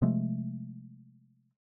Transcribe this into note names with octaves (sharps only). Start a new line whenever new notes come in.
C3 F3 G#3 A3